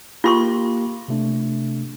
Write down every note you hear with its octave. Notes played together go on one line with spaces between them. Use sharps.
A#3 F4 G4 C6 C#6
C3 A3 D4